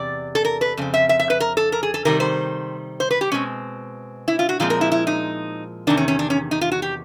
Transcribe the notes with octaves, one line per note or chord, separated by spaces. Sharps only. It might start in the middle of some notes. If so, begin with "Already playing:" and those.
Already playing: E2 C3 D5
A4
A#4
B4
F2 C#3 C4
E5
E5
E5
B4
A#4
A4
A#4
G#4
A4
C3 D#3 G3 A#4
C5
C5
B4
G4
B2 G#3 C4 C#4
E4
F4
F#4
A#2 F3 G#3 C4 F4
A#4
E4
E4
D#4
E2 C3 D#3 D4
C#4
C#4
D4
C#4
D#4
F4
F#4
G4